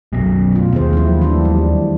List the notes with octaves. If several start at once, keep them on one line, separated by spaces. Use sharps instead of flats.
B1 F#2 B2
A3 F4
D#2 C4 G#4 C5
F3 F#3 E4
E3 A3 D4
G3